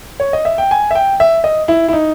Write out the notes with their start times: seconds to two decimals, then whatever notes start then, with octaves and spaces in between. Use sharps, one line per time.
0.20 C#5
0.33 D#5
0.45 E5
0.58 G5
0.71 G#5
0.91 E5
0.95 G5
1.20 E5
1.44 D#5
1.68 E4
1.88 E4
1.93 D#4